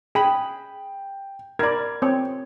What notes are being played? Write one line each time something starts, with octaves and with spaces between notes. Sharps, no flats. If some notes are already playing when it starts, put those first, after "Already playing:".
G#4 G5 B5
A#4 D5 B5 G#6
C4 C#5